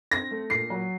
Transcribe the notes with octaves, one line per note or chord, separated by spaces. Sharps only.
C4 A#6
A3
A#2 C7
F#3